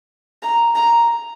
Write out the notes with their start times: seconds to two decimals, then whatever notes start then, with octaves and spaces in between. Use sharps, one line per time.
0.43 A#5
0.76 A#5